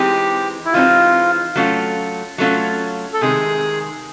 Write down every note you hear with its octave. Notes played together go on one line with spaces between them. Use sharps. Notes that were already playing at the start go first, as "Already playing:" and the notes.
Already playing: E3 G#3 C4 D#4 G4
E4
E3 G#3 C4 D#4 F4
F#3 A3 C#4 F4
F#3 A3 C#4 F4
A4
C3 D#3 G#3 G#4